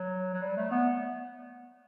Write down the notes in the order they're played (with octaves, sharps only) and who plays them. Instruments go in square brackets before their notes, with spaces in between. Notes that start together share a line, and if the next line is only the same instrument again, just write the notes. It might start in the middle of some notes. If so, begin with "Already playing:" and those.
Already playing: [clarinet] F#3
F#3
G3
A3
B3